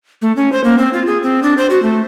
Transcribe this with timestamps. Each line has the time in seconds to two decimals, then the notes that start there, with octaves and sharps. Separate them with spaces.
0.22 A3
0.36 C#4
0.52 C5
0.64 A#3
0.78 C4
0.93 F4
1.07 G#4
1.23 C4
1.43 D4
1.58 C5
1.70 F#4
1.83 A3